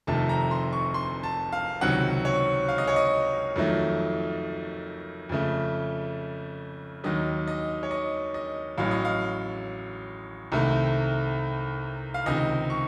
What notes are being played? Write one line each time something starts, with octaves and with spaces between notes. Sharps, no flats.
F1 F2 C3 D#3 A3 A5
A#5
C6
C#6
C6
A5
F5
C#2 C3 D#3 F#3 F#5
C#5
F5
D#5
C#5
D#5
F2 D#3 F#3 A3
F2 C#3 A3
D#2 D#3 F#3 D#5
D#5
C#5
D#5
D#5
A1 A2 F#3 F5
D#5
F5
C2 C3 D#3 A3
F5
C#2 C3 D#3 D#5
C#6